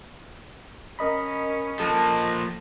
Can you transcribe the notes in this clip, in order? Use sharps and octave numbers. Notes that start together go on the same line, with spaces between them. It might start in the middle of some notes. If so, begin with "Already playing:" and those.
C#4 A#4 D#5 B5
F3 A#3 A4